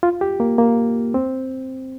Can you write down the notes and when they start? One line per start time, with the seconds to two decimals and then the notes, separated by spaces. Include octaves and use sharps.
0.03 F4
0.21 G4
0.40 A#3
0.58 A#3
1.14 C4